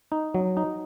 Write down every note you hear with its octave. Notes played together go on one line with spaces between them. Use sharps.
D#4
F#3
D#4